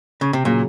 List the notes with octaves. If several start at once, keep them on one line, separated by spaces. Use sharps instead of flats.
C#3
C3
A#2 C#3 F#3